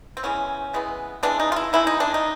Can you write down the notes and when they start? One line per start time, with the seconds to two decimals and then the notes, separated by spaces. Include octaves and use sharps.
0.17 C4
0.23 C#3 E3 G#3 B3 C#4
0.73 C#3 E3 G#3 B3
1.23 C#3 E3 G#3 B3 D4
1.40 D#4
1.52 F4
1.56 E4
1.73 C#3 E3 G#3 B3 E4
1.87 D#4
2.00 D4
2.14 D#4